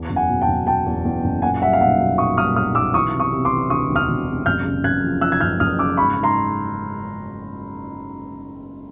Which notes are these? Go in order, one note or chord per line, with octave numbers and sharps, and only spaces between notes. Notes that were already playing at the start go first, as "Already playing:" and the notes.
Already playing: E2
F#1
F#5 G#5
B2
G5 A5
F#1
B2 G5 A5
E2
E2
F#1
A#2 F#5 G#5
G3 E5 F#5
F5
B1 E5 F#5
B1
A#2 C#6 D#6
G3 D#6 F6
B1 D#6 F6
B1 D6 E6
E3 C#6 D#6
C3
C#6 D#6
C3
C6 D6
E3
D2 C#6 D#6
E1
D#6 F6
E1
C3
F#1 F6 G6
C#3
F#1 F#6 G#6
F3
F3 E6 F#6
G#6
F#1 F6 G6
F#1 D#6 F6
C#3 D6 E6
G#2 B5 C#6
G#2
A#5 C6